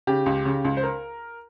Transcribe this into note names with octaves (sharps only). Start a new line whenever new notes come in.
C#3 G4
C#2
C#3
C#2
C5
A#4